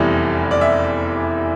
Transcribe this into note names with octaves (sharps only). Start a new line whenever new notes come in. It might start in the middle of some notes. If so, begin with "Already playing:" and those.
Already playing: F1 E2 E3 G3
D5
E5